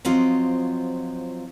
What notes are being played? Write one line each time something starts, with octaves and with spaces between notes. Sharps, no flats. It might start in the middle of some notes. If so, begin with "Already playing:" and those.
F3 F#3 C4 F4 D#5